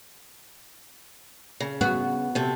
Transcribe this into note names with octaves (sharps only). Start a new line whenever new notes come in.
C#3
B3 F#4
C3 A3